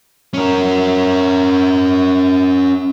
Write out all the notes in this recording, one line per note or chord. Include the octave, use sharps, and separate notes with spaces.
C#4 A#4